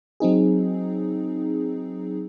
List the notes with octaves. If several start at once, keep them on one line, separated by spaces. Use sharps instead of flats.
F#3 C4 D#4 G#4